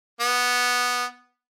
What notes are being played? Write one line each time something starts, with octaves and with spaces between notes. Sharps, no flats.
B3